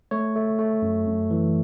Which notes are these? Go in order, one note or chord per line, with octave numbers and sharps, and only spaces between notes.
A3 C#5
A3
A3
F#2
F#2
E3